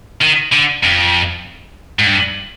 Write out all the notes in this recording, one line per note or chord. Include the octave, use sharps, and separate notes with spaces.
D#3
D3
F2
G#2
G2